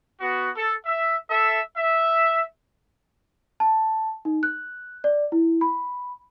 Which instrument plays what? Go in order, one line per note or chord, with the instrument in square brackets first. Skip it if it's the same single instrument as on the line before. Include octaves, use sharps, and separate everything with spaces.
[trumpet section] B3 F#4
A4
E5
A4 E5
E5
[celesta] A5
D#4
F#6
D5
E4
B5